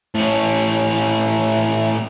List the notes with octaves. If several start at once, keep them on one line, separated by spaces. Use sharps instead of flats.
A2 C#4